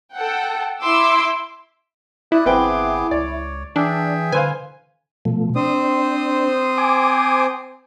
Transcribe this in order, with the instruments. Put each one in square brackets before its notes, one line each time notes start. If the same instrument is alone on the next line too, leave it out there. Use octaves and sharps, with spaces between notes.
[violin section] A4 F#5 G5
E4 E5 C6 D6 E6
[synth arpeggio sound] E4 [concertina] D5 D#6 F#6
[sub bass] G1 [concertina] B3 G#4 D6 [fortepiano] C4 B4 G5
[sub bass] C#2 [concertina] C#5 [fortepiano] D5
[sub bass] E3 [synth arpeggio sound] D4 [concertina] G#4 E5 G5
[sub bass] D3 [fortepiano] B4 C5 F5 [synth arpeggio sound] G#5
[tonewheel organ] B2 F3 A3
[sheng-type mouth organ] C4 C5 D#6 [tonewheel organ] D4
[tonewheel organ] G#5 D6